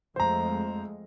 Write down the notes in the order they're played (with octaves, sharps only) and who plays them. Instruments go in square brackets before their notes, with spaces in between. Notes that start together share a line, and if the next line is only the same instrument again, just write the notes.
[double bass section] F2 G#3 A3 [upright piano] C5 A#5